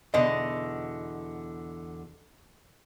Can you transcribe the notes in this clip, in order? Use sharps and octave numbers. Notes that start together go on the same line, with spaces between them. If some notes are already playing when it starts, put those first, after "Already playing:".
E2 B2 D3 D#5